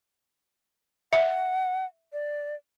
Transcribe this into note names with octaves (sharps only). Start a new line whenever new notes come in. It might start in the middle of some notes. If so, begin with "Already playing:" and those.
E5 F#5
D5